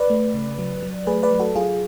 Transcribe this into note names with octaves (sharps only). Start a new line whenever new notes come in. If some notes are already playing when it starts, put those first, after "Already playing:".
Already playing: B4 D5
A3
C#3
F#3
F#3
A3 G#4 B4
B4 D5
F#3
F#4 A4
F#3 F4 G#4